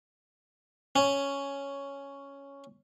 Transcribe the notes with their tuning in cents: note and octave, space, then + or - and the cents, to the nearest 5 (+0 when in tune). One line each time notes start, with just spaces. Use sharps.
C#4 +5